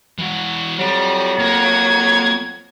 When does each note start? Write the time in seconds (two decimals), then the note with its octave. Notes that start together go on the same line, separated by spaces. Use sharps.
0.18 E3 F#4
0.78 F2 F#3 G3
1.39 A#3 G#6